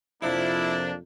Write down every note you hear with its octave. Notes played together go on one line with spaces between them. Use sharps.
F2 C3 F3 A#3 D4 E4